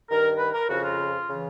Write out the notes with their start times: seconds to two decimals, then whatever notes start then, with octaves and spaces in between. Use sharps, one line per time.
0.09 G2 D#3 A#4
0.38 B4
0.54 A#4
0.69 F2 C#3 F3 F#4
0.84 F4
1.28 C#3 E3